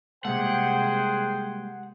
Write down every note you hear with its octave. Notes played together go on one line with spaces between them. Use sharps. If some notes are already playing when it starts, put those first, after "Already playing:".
C3 G3 G#3 A#3 G#4 C5 F#5 G5